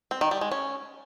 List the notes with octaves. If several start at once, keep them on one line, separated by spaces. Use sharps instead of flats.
C4
D#3
G3
G#3
C#4